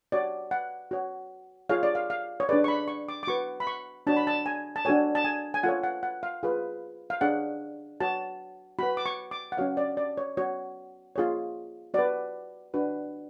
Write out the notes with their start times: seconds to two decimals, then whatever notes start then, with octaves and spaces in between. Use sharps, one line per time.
0.12 F#4 C#5 D5
0.51 F#5
0.91 F#4 C#5
1.69 F4 G#4 C#5 F5
1.83 D5
1.95 F5
2.10 F5
2.40 C#5
2.49 D4 G#4 B4 D5
2.64 C#6
2.68 B5
2.88 C#6
3.09 D6
3.23 D6
3.27 F#4 B4 C#6
3.60 B5
3.67 C#6
4.07 D4 F#4 C#5 A5
4.17 B5
4.27 A5
4.46 G#5
4.76 A5
4.85 D4 F#4 A4 C#5 G#5
5.15 A5
5.24 G#5
5.54 G#5
5.63 F4 A4 C#5 F#5
5.83 F#5
6.03 F#5
6.23 F5
6.43 F4 G#4 B4
7.10 F5
7.21 D4 G#4 C#5 F#5
8.01 F#4 C#5 A5
8.79 F#4 B4 B5
8.97 D6
9.06 C#6
9.31 D6
9.52 F#5
9.57 C#4 F#4 C#5 F5
9.77 D5
9.97 D5
10.18 C#5
10.37 F#4 C#5
11.16 F4 G#4 C#5
11.94 F#4 B4 D5
12.74 D4 F#4 B4